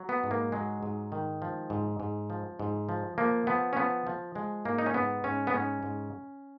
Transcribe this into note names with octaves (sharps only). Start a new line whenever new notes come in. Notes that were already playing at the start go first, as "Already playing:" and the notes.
Already playing: F#3
B3
G#2
A#3
F#3 G#3
G#2
D#3
F3
G#2
G#2
F3
G#2
F3
F3 A#3
F3 B3
C#4
F3 B3
F3
F3 G#3
G#2 A#3
D#4
C#4
G#2 B3
G#2 C#4
B3
G#2 C#4
G#2